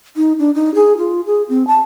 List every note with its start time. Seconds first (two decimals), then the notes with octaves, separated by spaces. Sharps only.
0.16 D#4
0.39 D4
0.55 D#4
0.75 G#4
0.97 F4
1.26 G#4
1.49 C4
1.67 A5